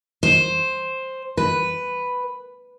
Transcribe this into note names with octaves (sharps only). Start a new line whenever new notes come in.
C5
B4